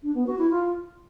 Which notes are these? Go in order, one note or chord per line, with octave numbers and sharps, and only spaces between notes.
D4
B3
F#4
E4
F4